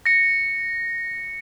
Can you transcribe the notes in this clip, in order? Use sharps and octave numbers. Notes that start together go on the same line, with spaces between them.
A#6 C#7